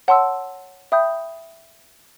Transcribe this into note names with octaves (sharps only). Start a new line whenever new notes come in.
C#5 F#5 A5 C6 E6
E5 G5 B5 D#6 G6